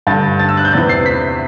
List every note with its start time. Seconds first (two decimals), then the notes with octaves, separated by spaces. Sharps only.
0.07 G2 D3 A6
0.39 A6
0.49 E6
0.57 F#6
0.65 G6
0.73 E2 C3 E3 A6
0.89 C7
1.06 B6